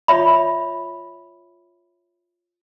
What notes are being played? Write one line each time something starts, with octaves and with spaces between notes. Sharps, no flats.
F4 C#5 E5 B5